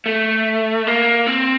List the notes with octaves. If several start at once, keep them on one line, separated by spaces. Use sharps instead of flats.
A3
A#3
C4